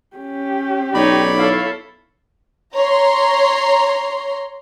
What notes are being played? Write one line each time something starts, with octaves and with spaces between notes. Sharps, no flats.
C#4 G4
B1 D#4 C#5 D5 B5
E4 A4 C#5 F5
C#5 A#5 C6